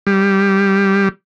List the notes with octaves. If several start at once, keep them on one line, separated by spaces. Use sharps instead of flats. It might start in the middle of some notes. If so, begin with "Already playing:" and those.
G3